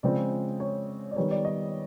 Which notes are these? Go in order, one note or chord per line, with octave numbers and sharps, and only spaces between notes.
C#3 F3 G#3 C4 D5
C#5
D5
D#3 G3 B3 C#5
D5
D#5